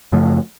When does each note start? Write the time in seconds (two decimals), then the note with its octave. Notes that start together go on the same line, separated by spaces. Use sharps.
0.12 F#2 C#3 F3 A3